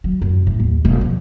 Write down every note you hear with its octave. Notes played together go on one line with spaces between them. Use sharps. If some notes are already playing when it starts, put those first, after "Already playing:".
F#3
F#2
A2
D#2
E1
F3